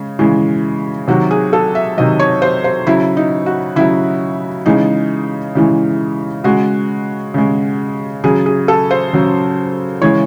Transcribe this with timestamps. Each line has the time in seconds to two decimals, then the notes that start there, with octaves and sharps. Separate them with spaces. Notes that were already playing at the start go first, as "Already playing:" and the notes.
Already playing: C#3 G#3
0.19 C#3 E3 G#3
1.08 C3 D#3 F#3 F#4
1.31 G#4
1.53 A4
1.75 E5
1.97 C3 D#3 F#3 D#5
2.19 C#5
2.42 C5
2.64 C5
2.87 C#3 F#3 E4
3.17 D#4
3.46 F#4
3.76 C#3 F#3 E4
4.66 C#3 E3 G#3 D#4
5.55 C#3 E3 G#3
6.44 C#3 G#3 F#4
7.34 C#3 G#3
8.24 C#3 F#3 G#4
8.46 G#4
8.68 A4
8.91 C5
9.13 C#3 F#3
10.02 C#3 E3 G#3 C#5